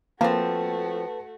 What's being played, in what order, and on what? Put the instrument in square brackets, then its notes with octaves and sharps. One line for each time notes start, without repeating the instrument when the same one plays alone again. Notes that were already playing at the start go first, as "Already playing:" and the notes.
[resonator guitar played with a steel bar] F3 C4 [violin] A3 F#4 [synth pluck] A#3 [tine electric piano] B4 A5